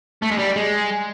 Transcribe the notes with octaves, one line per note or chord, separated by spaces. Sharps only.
A3
G#3
G3
G#3